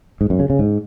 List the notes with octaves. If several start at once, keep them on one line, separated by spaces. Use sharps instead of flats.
G#2
F#2
C#3
C#3
G#2